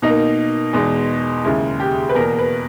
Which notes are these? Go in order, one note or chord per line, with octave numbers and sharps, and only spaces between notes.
B2 A#3 D#4
E2 B2 G#3
D#2 C#3 G#3 E4
G4
B4
E2 B2 A#3 A#4
B4